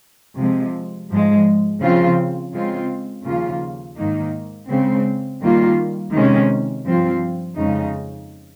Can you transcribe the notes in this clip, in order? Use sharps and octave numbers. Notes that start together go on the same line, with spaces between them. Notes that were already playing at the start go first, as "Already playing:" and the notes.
C3 F3 G#3
G#2 F3 G#3
C#3 F3 C4 F4
C#3 G#3 C4 F4
D#2 C#3 F3 A#3 F4
G#2 D#3 A#3 D#4
C#3 G#3 C4
D#3 G3 A#3 F4
C3 D#3 G#3 C#4
G2 F3 C4 F4
F2 C#3 G#3 D#4